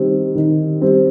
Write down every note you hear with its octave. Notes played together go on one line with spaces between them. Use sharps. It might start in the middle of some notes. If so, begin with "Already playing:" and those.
Already playing: D#3 G3 C4
D#3
G3 C4